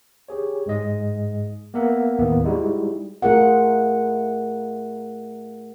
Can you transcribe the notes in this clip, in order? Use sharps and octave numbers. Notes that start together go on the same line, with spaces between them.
G4 G#4 C#5
G#2 G#3 D#5
A#3 B3 A#4 E5 F#5
D#2 A2 D#3 A#3 B3
G3 G#3 D#4 E4 F#4 G4
A3 F4 G#4 A#4 F#5